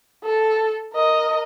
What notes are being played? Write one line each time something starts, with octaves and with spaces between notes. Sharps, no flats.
A4
A#4 D#5